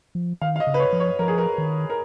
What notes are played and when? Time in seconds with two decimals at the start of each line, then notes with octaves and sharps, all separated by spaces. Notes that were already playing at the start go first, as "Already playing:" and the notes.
0.15 F3
0.41 D#3 F5
0.56 F5
0.60 D#5
0.67 C#3
0.74 B4
0.80 C#5
0.93 F3
1.00 C#5
1.19 F3 A#4
1.28 G#4
1.38 A#4
1.58 D#3
1.90 A#4